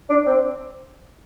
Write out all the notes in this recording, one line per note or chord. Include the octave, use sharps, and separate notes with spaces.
D4
C4